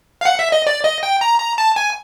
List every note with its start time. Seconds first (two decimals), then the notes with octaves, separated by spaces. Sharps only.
0.21 F5
0.25 F#5
0.39 E5
0.52 D#5
0.67 D5
0.84 D#5
1.03 G5
1.21 A#5
1.40 A#5
1.58 A5
1.76 G#5